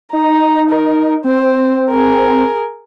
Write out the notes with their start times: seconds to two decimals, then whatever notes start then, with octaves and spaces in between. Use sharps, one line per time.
0.13 D#4 A#5
0.69 A#4
1.24 C4 C5
1.90 G#4 A#4